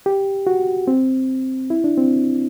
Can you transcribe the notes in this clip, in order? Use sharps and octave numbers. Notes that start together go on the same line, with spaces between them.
G4
F#4
C4
E4
D4
C4